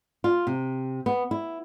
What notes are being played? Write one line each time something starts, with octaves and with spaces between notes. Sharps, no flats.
F4
C3
B3
E4